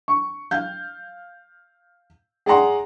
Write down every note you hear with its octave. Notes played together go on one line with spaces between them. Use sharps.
C#6
F5 G6
G#4 D5 F#5 A#5 C6